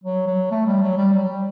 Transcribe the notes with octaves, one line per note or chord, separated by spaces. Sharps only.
F#3
F#3
A3
G3
F#3
G3
F#3
G3